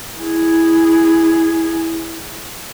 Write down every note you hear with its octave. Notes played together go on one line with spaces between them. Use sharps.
E4 G#4